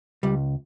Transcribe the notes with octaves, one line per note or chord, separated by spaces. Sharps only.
C#2 G3